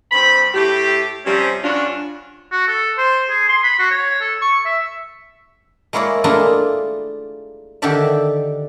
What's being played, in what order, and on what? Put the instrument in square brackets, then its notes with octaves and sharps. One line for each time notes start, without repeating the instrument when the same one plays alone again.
[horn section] G2 C4 B5
A2 G4
C3 F3 G3 C#4
G2 C#4 D4 F4 F#4
[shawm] F#4
A4
C5
G#4
C6
B5
F#4
C#5
A4
C#6
E5
[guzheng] G#3 A#3 E4 C#5 D5
A3 A#3 D4 E4 F4 G#4
D3 D#3 G4 A4 D5 E5